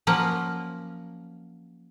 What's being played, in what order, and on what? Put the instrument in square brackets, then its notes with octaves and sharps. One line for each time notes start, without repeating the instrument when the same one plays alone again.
[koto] F3 F#3 A#3 C#4